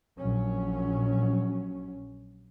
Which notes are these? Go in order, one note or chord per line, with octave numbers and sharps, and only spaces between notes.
A#1 F#3 C#4